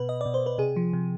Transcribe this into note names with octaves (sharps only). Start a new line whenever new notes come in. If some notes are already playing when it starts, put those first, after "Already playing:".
Already playing: B2 B4
D#5
B2 D5
C5
B4
C3 G#4
F3
C3